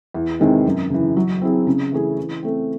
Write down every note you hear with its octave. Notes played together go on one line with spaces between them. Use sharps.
E2
C3 D#3 G#3 C4
F#2
C#3 E3
F#3
C4 E4 G#4
C#3
E3 A3 C#4 G#4
E3
A3 C4